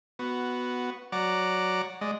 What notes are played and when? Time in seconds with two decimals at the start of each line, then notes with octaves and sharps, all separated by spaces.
0.19 B3 F#4
1.12 F#3 D5 F#5 A#5 D6
2.01 G#3 D5 D#5